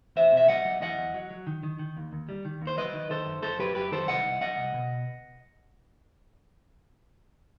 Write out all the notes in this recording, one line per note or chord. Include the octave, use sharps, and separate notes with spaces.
E2 C5 E5
B2 E5
F#3 D#5 F#5
F#3
E2 D#5 F#5
E2
F#3
F#3
D#3
D#3
D#3
D#2
D#2
G3
D#3
D#2
C5
F#3 B4 D#5
D#3
D#3 A4 C5
F#2
F#2 A4 C5
F#3 G4 B4
F#2 G4 B4
D#3 A4 C5
C2 D#5 F#5
C2
F#3 D#5 F#5
C2
B2